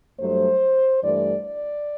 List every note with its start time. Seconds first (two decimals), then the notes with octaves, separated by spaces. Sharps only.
0.18 G2 F#3 A3 C5
1.02 G2 E3 A3 D5
1.44 D5